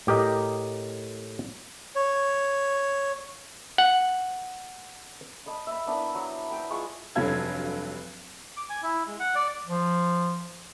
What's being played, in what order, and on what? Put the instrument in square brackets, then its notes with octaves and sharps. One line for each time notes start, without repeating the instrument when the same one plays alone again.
[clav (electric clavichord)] A2 G4 A#4 D#5
[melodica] C#5
[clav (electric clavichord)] F#5
[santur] D#5 A5 B5
E5 B5
B3 D4 E4 A#4
F#3
B4 G5 B5
G#3 F4 C6 C#6
[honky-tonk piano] F1 G2 F#3 A4 F5 G#6
[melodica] D6
G#5
E4
G#3
F#5
D5
[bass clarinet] F3